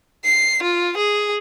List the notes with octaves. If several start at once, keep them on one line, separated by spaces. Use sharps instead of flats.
C7
F4
G#4